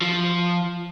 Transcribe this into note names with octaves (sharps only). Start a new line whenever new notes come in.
F3